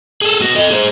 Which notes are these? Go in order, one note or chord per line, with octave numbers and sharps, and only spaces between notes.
G#4 A4
B3 F#4
A4 D#5
G#4 C5